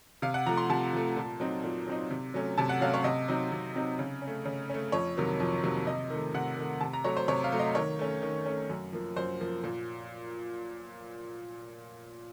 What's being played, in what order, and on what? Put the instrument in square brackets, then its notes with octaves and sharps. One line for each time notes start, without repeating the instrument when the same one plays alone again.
[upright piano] C3 F5
F#5
F3 A3 A#5
C6
C3 A5
F3 A3
A#2
F#3 C4 D#4
A#2
F#3 C4 D#4
C3
F#3 A3 C#4
C3 A5
F#5
F#3 A3 C#4 F5
C#5
C3 D#5
F#3 C4 D#4
C3
F#3 C4 D#4
C#3
C#4
A3
C#3
A3 C#4
F2 C#5
C3 D#3 F#3 A#3
F2
C3 D#3 F#3 A#3
C3 D#5
D#3 A3
C3 F#5
D#3 A3
C3 A5
A#5
F#3 A3 C#5
C5
C3 C#5
F5
F#3 A3
D#5
D#3 C#5
A3 C#4
D#3
A3 C#4
F#2
F3 A#3
F#2 C5
F3 A#3
A#2